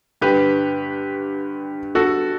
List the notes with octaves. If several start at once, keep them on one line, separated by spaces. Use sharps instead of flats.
G2 D3 G4 B4
F#4 A4